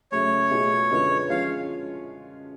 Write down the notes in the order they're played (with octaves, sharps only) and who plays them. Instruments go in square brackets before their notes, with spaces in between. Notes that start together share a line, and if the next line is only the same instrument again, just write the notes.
[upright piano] F#2 C#3 F#3 A3 C#4 [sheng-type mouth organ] C#5
[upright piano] B2 A3 F4 G#4
F#2 D3 G#3 B3 F4
[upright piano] F3 G#3 C#4 F4 [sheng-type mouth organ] F5